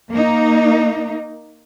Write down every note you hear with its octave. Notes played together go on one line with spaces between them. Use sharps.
A#3 D#4